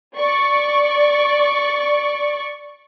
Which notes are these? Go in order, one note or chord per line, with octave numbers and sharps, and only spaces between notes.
D5 C#6